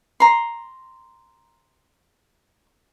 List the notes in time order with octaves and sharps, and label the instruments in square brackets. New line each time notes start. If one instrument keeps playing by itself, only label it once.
[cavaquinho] A#5 C6